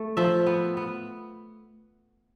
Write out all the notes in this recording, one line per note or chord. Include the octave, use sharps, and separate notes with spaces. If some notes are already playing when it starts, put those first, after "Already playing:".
Already playing: A3
F3 E5
B3
B3